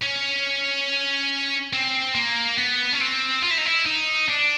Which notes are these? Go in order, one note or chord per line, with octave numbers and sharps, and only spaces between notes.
C#4
C4
A#3
B3
C#4
C4
F4
E4
D#4
E4
D#4
D4